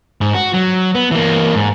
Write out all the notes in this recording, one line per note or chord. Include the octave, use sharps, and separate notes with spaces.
G#2
F#4
F#3
B3
E3 A#3
G#2